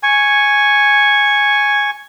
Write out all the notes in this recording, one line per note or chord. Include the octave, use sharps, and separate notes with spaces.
G#5 C#6